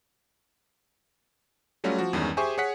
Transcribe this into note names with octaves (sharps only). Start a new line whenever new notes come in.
F#3 G3 A3 C#4 F4 F#4
F3 F#4
E2 G2 D#3 G#3 C#4
G4 G#4 C5 E5 G#5 C#6
G#4 C#5 F#5 B6